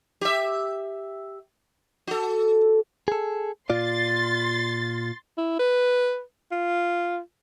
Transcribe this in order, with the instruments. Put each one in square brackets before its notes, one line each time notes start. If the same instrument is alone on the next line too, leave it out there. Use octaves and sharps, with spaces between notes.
[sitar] G4 E5
F#4 A4
[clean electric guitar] G#4 A4
[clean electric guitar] A#2 F4 D5 [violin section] C6 A6
[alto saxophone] E4
B4
F4